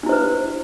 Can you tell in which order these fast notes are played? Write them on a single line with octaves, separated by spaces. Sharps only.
D4 E4 C5 B4